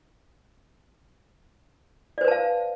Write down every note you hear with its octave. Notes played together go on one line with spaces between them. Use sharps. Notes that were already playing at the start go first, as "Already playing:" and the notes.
B4 C5 D5 F5 A5